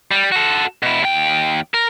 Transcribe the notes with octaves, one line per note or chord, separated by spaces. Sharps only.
G3
F#4 A4
B2 E4
D#2 G5
A#4